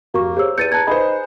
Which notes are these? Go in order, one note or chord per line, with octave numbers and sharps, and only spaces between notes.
F1 A#3 F#4 C#6
G4 G#4 C5 C#5 E6
E2 G6 A6 C#7 D#7
A5 A#5 F#6 G#6
D#4 G#4 B4 C5 B5